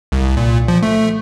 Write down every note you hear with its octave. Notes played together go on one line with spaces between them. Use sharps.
C2
A#2
F3
A3